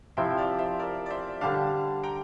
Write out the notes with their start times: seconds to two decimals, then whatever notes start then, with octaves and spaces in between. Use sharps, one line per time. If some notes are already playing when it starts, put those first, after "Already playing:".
0.17 C3 F3 C4 E4 E5 G5
0.37 D5 F5
0.58 C5 E5
0.79 A#4 D5
1.06 D5
1.10 C5 E5
1.41 D3 G3 D4 F5 A5
2.03 G5 A#5